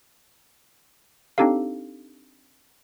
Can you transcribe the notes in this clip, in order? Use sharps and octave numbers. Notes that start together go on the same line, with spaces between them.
C4 D4 D#4 G4 A4 F5